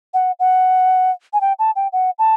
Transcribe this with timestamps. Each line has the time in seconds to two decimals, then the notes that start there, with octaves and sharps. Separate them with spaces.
0.14 F#5
0.39 F#5
1.33 G#5
1.41 G5
1.59 A5
1.76 G5
1.93 F#5
2.19 A5